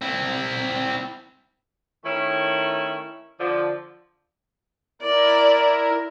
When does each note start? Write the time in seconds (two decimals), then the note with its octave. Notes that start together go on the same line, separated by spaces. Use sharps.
0.02 C4 E4
2.05 D#3 A3 C#4 E4
3.40 D3 F3
5.02 E4 A#4 D5